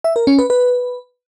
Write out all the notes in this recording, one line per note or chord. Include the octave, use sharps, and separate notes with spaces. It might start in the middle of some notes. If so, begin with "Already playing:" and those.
E5
A#4
C#4
B4
B4